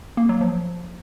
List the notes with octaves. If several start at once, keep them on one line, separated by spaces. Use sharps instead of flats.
A#3
F#3
F3